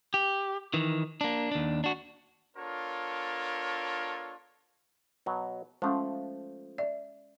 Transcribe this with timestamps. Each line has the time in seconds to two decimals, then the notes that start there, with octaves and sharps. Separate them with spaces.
0.14 G4
0.74 D#3 E3
1.21 A#3 D4
1.51 D#2 D4
1.84 D4 F#4
2.57 B3 D4 F4 A4 A#4 C#5
5.26 B2 F#3
5.82 F3 G#3 A3 C#4 F5
6.78 D5 E5